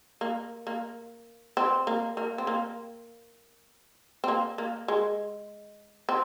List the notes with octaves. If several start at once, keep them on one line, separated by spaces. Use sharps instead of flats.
A#3
A#3
C4
A#3
A#3
C4
A#3
C4
A#3
A#3
G#3
C4